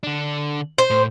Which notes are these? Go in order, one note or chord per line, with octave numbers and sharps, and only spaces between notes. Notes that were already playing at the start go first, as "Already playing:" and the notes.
D3 D4
C5
A2